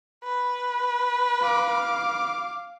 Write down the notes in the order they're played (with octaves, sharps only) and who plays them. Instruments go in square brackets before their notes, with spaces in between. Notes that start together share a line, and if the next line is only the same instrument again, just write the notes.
[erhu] B4
[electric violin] F5 D6